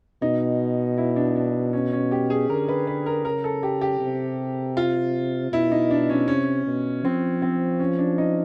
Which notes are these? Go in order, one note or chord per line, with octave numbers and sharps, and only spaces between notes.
B2 D#4
E4
D4
D4
C#4
C#4
G4
G#4
D3 A#4
B4
B4
A#4
C#3 A#4
A4
G4
G4
C3
F4
B2 E4
D#4
D4
C#4
C3 C#4
B2
F3 C4
C4
C#4
D4
D#4